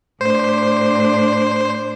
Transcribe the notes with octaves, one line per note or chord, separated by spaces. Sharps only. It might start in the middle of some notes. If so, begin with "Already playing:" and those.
A2 D4 C5